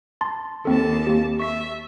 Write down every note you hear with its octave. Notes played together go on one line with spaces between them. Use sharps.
A5 C6 A6
D#2 C4 A4 A5
A#3 G4
E5 C#6 B6